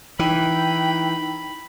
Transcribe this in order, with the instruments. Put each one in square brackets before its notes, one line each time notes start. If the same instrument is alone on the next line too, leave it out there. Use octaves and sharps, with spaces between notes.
[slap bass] E3 [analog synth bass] D#4 [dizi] G5 [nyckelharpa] B5